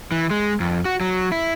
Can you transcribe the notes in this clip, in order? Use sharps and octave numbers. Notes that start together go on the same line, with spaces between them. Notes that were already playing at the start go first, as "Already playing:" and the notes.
E3
G#3
F2
F#4
F#3
E4